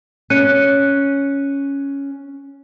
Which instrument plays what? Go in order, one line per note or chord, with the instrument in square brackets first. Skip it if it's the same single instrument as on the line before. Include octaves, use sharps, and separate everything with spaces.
[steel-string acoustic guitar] C#4 [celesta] F#6 C#7 D#7